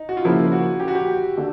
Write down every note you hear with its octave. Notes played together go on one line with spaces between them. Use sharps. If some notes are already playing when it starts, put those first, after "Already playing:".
Already playing: D#4
F#4
F4
C#3 F3 A#3 E4
F#4
G4
F#4
G4
D3